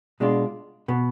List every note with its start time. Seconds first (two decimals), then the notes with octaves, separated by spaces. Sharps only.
0.20 B2 G#3 D4 F4
0.88 B2 B3